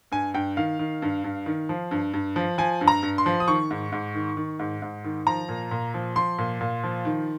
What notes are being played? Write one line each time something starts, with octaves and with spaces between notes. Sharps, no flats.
G2 G#5
G2 G5
D#3 F5
D#3
G2
G2
D#3
F3
G2
G2
F3
F3 G#5
G2
A#5
G2
C6
F3
D#6
D#3 C#6
G#2
G#2
D#3
D#3
G#2
G#2
D#3
F3 A#5
A#2
A#2
F3
F3 C6
A#2
A#2
F3
D#3